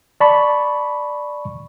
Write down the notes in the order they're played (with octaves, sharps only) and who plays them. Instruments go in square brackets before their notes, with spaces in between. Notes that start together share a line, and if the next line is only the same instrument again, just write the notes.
[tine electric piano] D5 A5 B5 C#6